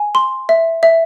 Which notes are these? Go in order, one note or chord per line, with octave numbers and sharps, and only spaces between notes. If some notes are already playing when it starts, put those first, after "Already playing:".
Already playing: G#5
C6
E5
E5